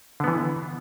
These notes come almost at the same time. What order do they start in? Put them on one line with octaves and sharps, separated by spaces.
D3 B3 E3